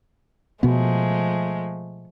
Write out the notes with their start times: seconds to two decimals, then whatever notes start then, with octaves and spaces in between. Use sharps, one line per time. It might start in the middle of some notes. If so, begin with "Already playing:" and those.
0.63 B2 F3 G#3 A3 B3